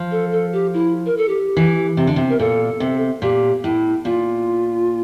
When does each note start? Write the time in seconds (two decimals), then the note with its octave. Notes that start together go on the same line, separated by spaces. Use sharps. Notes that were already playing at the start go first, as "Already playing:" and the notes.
Already playing: F3
0.11 A4
0.32 A4
0.53 G4
0.74 E4
1.06 A#4
1.17 A4
1.29 G4
1.57 E3
1.97 C3
2.07 D3
2.16 C3
2.30 A#4
2.39 A#2 A4
2.80 C3
3.22 A#2 G4
3.64 A2 E4
4.05 A#2 F4